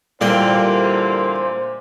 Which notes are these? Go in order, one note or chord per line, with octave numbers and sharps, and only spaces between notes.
A#2 D3 E3 G3 A#3 C5 G5